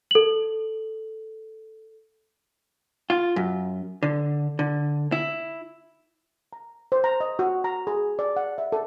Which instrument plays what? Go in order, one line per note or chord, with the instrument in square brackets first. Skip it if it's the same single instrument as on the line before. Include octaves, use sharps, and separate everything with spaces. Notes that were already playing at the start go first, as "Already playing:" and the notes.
[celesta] A4 F#7
[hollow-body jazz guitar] F4
F#2
D3
D3
E4
[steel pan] A#5
C5
A#5
D#5
F#4
A#5
G#4
D5
F#5
E5
A4